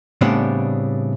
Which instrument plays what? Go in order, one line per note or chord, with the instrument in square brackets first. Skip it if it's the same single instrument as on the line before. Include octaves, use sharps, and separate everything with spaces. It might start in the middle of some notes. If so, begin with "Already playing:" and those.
[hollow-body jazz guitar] A2 C#3 G3 B3 C4 D4